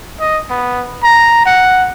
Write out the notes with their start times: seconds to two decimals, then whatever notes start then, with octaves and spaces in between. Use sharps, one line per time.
0.20 D#5
0.50 B3
1.03 A#5
1.46 F#5